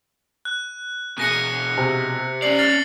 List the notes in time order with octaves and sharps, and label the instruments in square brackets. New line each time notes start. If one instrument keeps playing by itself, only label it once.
[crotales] F#6
[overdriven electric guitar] B2 G#4 [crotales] F#6 A#6 C#7
[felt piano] C3
[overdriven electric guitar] C#4 D5 [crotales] C7 F#7
[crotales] F6 A6 C7